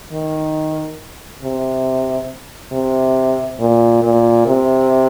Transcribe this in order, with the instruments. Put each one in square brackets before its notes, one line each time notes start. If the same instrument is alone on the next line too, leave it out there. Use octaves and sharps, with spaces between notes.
[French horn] D#3
C3
C3
A#2
A#2
C3